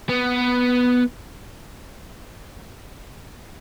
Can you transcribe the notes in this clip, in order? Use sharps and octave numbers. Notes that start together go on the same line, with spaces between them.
B3